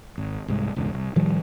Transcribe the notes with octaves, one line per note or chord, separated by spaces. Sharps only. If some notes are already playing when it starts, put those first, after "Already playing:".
G#1
C2 G#2
E1 C#2 G#2
C2
A2 D#3 F3 G3